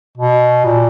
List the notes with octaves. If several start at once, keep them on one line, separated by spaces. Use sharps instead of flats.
B2
A#2